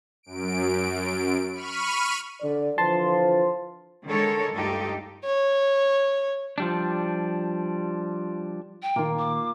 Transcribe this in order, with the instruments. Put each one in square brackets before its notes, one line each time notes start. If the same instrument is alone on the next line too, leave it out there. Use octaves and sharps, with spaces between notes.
[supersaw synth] F#2 D7
B5 C#6 F6 D#7
[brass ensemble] D3 D5
[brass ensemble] D3 E3 F3 [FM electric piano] A5 C6
[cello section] D3 D#3 G#3 A4 A#4 C#5
D2 G2 D#4 F4 G4 A4
[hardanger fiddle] C#5
[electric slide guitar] F3 G3 D4
[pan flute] G5
[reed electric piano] A#2 D#3 [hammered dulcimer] A#3 F4
[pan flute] D6